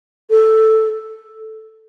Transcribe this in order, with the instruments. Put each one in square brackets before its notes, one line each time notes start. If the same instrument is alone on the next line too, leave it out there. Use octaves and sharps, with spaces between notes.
[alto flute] A4